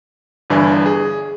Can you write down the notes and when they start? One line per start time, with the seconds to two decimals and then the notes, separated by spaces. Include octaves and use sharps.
0.50 G1 G2 E3 D4 E4 G#5
0.86 G#4